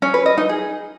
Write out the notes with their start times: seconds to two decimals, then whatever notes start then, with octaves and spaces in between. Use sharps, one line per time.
0.02 C#4
0.14 B4
0.26 D#5
0.37 D#4
0.49 G#4